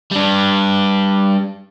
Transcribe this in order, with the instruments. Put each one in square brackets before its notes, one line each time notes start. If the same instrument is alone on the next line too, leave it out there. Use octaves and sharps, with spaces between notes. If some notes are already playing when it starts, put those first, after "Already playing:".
[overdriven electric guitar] G3 D4